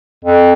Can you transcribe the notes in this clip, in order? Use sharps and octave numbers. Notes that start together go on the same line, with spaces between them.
F2